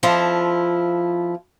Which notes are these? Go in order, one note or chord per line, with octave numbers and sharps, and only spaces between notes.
F2 F3 E4 F4 A5